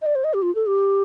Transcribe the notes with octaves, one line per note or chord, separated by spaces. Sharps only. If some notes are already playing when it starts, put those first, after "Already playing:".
D#5
D5
C5
D#5
G4
F4
A4
G4